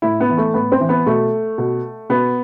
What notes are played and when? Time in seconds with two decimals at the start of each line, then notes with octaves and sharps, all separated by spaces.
0.02 A2 E4
0.20 B3
0.29 E3
0.38 A3
0.54 A2 B3
0.72 C4
0.80 E3
0.89 B3
1.06 B2 A3
1.58 B2
2.09 B2 B3